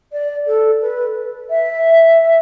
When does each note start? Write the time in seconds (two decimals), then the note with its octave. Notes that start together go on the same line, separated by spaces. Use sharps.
0.12 D5
0.46 A4
0.80 B4
1.49 E5